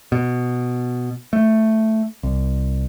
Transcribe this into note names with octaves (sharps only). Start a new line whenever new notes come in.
B2
A3
C2